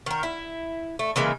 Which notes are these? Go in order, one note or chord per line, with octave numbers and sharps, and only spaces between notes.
D#3 A#4
E4
A3
C#3 E3 G#3 A#3